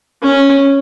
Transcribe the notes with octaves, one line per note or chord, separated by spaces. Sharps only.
C#4